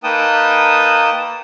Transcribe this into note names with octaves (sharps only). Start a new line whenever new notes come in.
A#3 D#4 B4 G5 A5 D#6